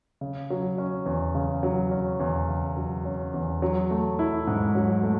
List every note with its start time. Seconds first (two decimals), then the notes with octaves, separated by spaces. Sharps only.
0.21 C#3
0.50 F#3
0.78 C#4
1.06 E2
1.35 C#3
1.63 F#3
1.91 C#4
2.20 E2
2.48 C#3
2.77 F#3
3.05 C#4
3.34 E2
3.62 F#3
3.90 A3
4.19 E4
4.47 G#2
4.75 F#3
5.03 A3